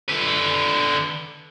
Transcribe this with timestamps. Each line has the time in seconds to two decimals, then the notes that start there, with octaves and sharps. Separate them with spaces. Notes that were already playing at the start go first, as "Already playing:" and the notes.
0.08 D3 B4